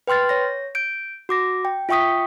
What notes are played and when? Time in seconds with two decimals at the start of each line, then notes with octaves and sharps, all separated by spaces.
0.07 B4 G5 C6 F6 A6
0.29 C#5 A#6
0.75 G6 D7
1.29 F#4 D6 A#6
1.65 G5
1.89 F4 E5 G5 C#6 D#6 B6